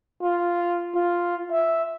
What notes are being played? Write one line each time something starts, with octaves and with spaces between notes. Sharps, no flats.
F4
F4
E5